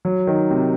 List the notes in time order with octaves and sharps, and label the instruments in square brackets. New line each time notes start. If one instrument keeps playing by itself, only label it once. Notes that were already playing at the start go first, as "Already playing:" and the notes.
[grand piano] F#3
D#3
C3